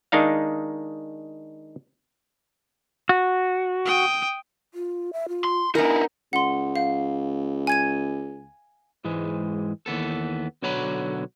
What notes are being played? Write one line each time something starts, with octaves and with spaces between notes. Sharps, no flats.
D#3 G#3 D4 D#4 F5
F#4
G5 D#6
F4
E5
F4
C6
B3 D#4 E4 A#4 G#5
C#2 F#5 C6
F5
G#5 G#6 D#7
G#2 E3 G#3
D#2 E3 B3 A4
B1 D3 F#4 C#5 A#5 B5